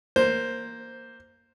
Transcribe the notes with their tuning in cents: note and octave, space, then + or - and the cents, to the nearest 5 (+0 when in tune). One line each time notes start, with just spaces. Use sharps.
A#3 +0 C5 +0